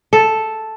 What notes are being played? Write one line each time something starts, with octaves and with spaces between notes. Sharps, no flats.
A4